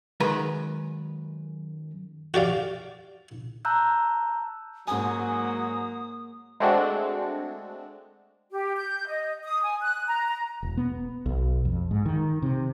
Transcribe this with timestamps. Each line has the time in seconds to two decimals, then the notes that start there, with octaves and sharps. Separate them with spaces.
0.20 F#2 D#3 G#3 A#4 B4 A#5
2.34 F#4 G4 D5 F5
3.65 A5 A#5 E6 F#6 G6
4.87 G#2 F#3 A#3 G#5 D#6
6.60 G#3 A3 C4 D4 F#4
8.52 G4
8.77 G6
9.07 D#5
9.44 D#6
9.62 G#5
9.81 F#6
10.08 A#5
10.27 A#5
10.63 E1
10.77 B3
11.26 B1
11.65 F2
11.91 G#2
12.06 D#3
12.42 C3